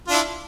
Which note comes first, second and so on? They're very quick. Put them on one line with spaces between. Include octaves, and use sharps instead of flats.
F4 D4 E4